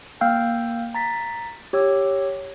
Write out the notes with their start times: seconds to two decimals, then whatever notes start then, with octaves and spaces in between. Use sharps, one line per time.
0.21 A#3 F5 G5 E6 F6 G6
0.95 A#5 A6 B6
1.73 G4 C#5 D6 E6